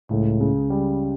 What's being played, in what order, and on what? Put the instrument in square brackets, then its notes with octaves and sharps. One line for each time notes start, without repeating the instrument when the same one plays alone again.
[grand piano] C#2 [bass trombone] A2
[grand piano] C#3
G3